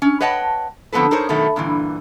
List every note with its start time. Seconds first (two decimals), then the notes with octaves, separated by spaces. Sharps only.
0.02 C#4
0.20 B4 C#5 D#5 F#5 G5 A5
0.92 D3 F3 B3 C4 A4 B4
1.11 D#4 G#4 A#4 C5 C#5
1.29 B2 D#3 F#3 A3
1.56 G2 A#2 D3 E3